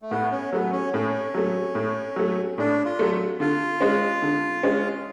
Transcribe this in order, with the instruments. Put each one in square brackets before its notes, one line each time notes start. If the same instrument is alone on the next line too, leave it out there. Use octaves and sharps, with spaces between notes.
[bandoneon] A3
[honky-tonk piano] A2 [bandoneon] B3
[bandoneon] C#4
[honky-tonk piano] F#3 A3 [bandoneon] B3
[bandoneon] C#4
[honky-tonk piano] A2 [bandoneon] C#4
[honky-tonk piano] F#3 A3
A2
F#3 A3
[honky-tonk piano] A2 [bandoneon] D4
[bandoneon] F4
[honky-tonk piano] F#3 A3
[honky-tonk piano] D3 [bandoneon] F4
[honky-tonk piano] G#3 C#4
D3
G#3 C#4